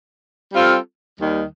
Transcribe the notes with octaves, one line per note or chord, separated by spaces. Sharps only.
G3 C4 F4 A4
D#2 D#3 G3